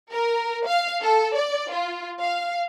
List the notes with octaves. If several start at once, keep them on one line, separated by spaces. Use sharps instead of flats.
A#4
F5
A4
D5
F4
F5